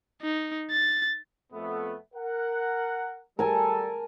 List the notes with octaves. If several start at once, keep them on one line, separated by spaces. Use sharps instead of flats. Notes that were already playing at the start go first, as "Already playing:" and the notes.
D#4
A6
F2 A3 B3
A#4 F#5
G3 A4 A#4 G#5 A5